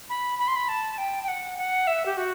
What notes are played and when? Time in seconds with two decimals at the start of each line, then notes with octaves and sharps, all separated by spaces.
0.09 B5
0.39 B5
0.48 C6
0.56 B5
0.69 A5
0.98 G5
1.23 G5
1.28 F#5
1.58 F#5
1.87 E5
2.06 G4
2.17 F#4